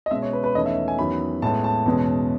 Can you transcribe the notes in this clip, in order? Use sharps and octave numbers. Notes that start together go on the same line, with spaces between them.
D#5
B2 G#3 C#4 E5
C#5
B4
B4
E2 D#3 A3 C#4 D#5
E5
G#5
E2 D#3 F#3 C#4 B5
A2 G#3 B3 A5
A5
E2 B2 G#3 C#4